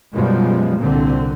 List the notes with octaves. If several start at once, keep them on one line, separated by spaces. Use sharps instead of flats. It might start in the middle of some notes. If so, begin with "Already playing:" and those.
F#2 B2 F3 G3 G#3
C2 A#2 D3 C4